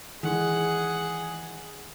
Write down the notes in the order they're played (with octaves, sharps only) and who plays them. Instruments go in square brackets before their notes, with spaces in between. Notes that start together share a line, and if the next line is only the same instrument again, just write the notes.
[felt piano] D#3 G#3 [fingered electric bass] E3 [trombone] G#4 [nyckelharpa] F#5